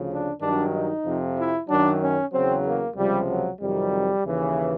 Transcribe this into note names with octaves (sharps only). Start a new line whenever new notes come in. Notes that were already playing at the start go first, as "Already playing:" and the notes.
Already playing: D2 C#3 F3
D4
G2 D#3 F#3 D4
D#4
F2 C3 F3
E4
F#2 D#3 F#3 D4
C#4
E2 C#3 F#3 C4
A#3
C#2 C3 F3 G3
F#3
F2 C3 D#3 F#3 G3
D#2 C#3 E3